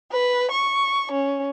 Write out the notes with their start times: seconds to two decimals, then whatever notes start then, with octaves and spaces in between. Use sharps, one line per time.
0.11 B4
0.51 C#6
1.11 C#4